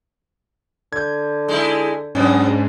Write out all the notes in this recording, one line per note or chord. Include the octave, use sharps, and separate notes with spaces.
D3 G6 G#6
G#3 D#4 E4
G#2 F#3 B3 C#4 D4